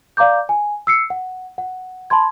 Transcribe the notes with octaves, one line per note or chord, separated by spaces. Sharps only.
D5 F5 A#5 D6 G6
G#5
E6 C7 C#7
F#5
F#5
A5 B5 C6 G#6